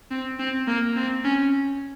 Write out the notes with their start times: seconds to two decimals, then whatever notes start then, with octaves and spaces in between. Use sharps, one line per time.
0.11 C4
0.39 C4
0.68 A#3
0.96 C4
1.24 C#4